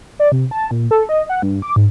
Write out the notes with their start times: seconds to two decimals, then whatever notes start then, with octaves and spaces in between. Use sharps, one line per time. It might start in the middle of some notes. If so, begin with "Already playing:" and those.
0.19 D5
0.32 C3
0.51 A5
0.71 A#2
0.91 A4
1.09 D#5
1.29 F#5
1.42 G2
1.62 D6
1.76 G#2